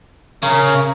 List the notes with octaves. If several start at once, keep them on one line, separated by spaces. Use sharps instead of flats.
C#3 A#4